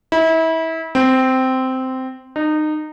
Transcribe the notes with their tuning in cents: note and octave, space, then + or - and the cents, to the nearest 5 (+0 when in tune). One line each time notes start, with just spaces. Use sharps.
E4 -30
C4 -10
D#4 -25